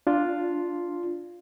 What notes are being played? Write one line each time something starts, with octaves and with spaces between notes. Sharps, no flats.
D4 F4